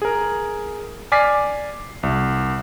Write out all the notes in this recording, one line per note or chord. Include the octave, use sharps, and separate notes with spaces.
G#4 A#4
D5 G#5 D6 F6 B6 C7
C2